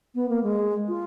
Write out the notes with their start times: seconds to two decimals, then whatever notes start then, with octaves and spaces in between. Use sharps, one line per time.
0.15 B3
0.29 A#3
0.43 G#3
0.88 F4